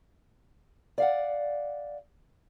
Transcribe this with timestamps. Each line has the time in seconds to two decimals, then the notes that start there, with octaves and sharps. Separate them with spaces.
0.98 D5 F5 F#5